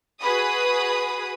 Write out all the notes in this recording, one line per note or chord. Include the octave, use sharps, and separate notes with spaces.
F#4 G#4 B4 B5 D#6